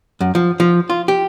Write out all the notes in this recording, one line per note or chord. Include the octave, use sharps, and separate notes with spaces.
F#2
F3
F3
F4
G4